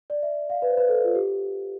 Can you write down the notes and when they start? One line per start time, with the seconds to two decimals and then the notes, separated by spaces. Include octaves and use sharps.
0.10 D5
0.23 E5
0.50 F5
0.62 B4
0.70 C5
0.78 B4
0.89 A4
1.04 F4
1.15 G4